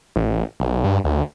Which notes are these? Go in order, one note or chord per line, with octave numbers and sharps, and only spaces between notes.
A1
B1
G2
D2